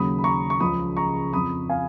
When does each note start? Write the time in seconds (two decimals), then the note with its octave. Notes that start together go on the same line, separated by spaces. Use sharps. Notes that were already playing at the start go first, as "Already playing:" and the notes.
Already playing: D#2 C#3 F#3 B5 D#6
0.19 B5
0.24 A#5 C#6
0.50 C#6
0.60 C#2 C#3 F3 B5 D#6
0.97 A#5 C#6
1.33 F2 F3 B5 D#6
1.69 F5 G#5